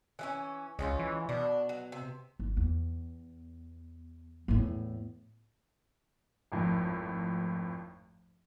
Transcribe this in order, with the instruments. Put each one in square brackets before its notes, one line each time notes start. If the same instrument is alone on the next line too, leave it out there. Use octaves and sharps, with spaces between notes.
[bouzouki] E3 A3 C#4
[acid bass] C#2 [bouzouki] G#3 C#4 F4
[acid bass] E3
[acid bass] B2 [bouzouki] D4
[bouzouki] F#3
C3
[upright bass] G1
E2
E2 A2
[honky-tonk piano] G#1 F2 A2